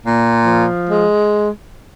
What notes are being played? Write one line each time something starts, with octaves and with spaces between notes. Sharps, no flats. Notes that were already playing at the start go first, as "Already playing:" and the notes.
A#2
F3
G#3